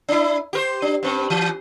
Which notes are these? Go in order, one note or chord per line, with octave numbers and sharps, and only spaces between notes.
D4 E4
G4 A#4 C5
D4
G2 C4
E3